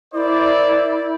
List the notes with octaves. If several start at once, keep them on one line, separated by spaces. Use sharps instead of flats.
E4 A#4 C5 D5